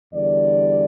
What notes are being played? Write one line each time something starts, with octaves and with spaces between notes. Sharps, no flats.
E2 D3 G3 D5